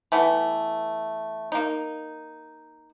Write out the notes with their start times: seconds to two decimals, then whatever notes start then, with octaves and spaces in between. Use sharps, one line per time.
0.12 E3 A3 B3
1.52 A#3 D#4